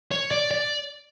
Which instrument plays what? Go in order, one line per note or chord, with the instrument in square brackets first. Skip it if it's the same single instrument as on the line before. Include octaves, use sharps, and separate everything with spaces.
[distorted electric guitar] C#5
D5
D5